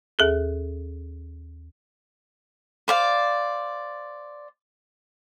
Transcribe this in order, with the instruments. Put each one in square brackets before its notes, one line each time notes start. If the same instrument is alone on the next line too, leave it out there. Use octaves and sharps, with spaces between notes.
[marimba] D#2 G#4 A4
[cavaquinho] C5 D5 F5